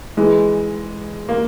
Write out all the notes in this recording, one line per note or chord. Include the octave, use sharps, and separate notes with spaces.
E3 G#3
A#3